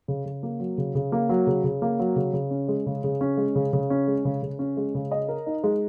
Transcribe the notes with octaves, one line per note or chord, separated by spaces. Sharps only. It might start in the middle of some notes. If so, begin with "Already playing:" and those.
C#3
C#3
A#3
F#3
C#3
C#3
A#3
F#3
C#3
C#3
A#3
F#3
C#3
C#3
C#4
G#3
C#3
C#3
C#4
G#3
C#3
C#3
C#4
G#3
C#3
C#3
C#4
G#3
C#3
D#5
A#4
D#4
G#3